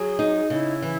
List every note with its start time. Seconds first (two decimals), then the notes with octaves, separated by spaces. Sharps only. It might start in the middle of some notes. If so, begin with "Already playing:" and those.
Already playing: F#3 G#4
0.19 D#4
0.50 C#3 E4
0.82 E3